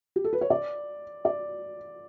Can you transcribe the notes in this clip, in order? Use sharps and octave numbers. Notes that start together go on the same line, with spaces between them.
G4
A4
B4
C#5
D5
D5